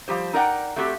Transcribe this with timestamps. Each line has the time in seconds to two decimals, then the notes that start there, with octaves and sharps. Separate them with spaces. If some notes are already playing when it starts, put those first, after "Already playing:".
0.08 F3 G3 G4 C5
0.33 D#4 A#4 D5 F#5 G5
0.76 A3 C4 F#4 G4 A4